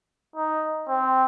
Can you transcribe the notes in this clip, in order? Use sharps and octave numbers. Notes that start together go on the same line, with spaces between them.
D#4
C4